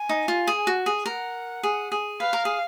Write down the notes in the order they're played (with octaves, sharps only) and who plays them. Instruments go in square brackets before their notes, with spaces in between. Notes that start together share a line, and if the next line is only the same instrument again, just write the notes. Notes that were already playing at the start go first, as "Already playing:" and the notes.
Already playing: [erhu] G#5
[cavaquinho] D#4
F4
G#4
F#4
G#4
[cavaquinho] A#4 [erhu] F#5
[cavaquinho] G#4
G#4
[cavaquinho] B4 [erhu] F5
[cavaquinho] A#4
G#4